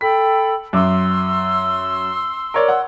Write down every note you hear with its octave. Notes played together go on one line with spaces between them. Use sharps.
A4 G5 B5 B6
F#2 E5 C6 D6 E6
A#4 C#5 D5
F#5